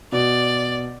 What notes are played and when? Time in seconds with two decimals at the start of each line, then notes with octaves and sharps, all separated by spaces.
0.12 B2 D5